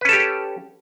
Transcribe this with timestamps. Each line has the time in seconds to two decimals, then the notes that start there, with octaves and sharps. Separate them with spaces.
0.01 B4
0.05 C#4
0.09 A4
0.12 G4